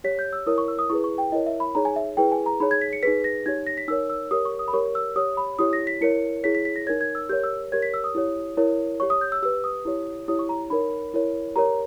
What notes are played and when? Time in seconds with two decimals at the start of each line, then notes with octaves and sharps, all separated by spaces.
0.04 G4 C#5 B6
0.19 G6
0.33 E6
0.46 E4 A#4 C#5 D#6
0.58 C#6
0.68 E6
0.79 D#6
0.90 E4 G#4 B4 C#6
1.04 C#6
1.18 G5
1.32 E4 A#4 C#5 D#5
1.46 E5
1.60 B5
1.75 D#4 G#4 C#5 A#5
1.85 G#5
1.96 E5
2.17 E4 G#4 B4 G5
2.32 G#5
2.46 A#5
2.60 D#4 G#4 C#5 B5
2.71 G#6
2.81 B6
2.93 C#7
3.03 D#4 G#4 B4 B6
3.24 A#6
3.46 D#4 G4 C#5 G#6
3.67 A#6
3.77 B6
3.88 D#4 A#4 C#5 E6
4.10 E6
4.31 G4 A#4 C#5 D#6
4.45 C#6
4.59 D#6
4.68 B5
4.73 G4 A#4 C#5 C#6
4.95 E6
5.16 G4 C#5 D#6
5.37 B5
5.59 E4 G4 C#5 D#6
5.73 A#6
5.87 B6
6.01 E4 A#4 C#5 C#7
6.44 E4 G#4 C#5 B6
6.55 B6
6.65 B6
6.76 A#6
6.87 D#4 A#4 C#5 G#6
7.01 G#6
7.15 E6
7.29 G4 A#4 C#5 G6
7.44 E6
7.72 G4 A#4 C#5 G#6
7.82 B6
7.94 E6
8.04 D#6
8.15 E4 G4 C#5
8.57 E4 A#4 C#5
9.00 G4 C#5 C#6
9.10 D#6
9.21 G6
9.32 E6
9.42 G4 B4 E6
9.64 D#6
9.85 E4 G4 C#5
10.28 E4 G4 C#5 D#6
10.39 C#6
10.49 A#5
10.70 D#4 A#4 C#5 B5
11.14 E4 A#4 C#5
11.56 G4 A#4 C#5 A#5